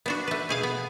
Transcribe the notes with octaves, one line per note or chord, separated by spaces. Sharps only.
B3 D4 F#4
A3 B4
B2 G#4 F5
B3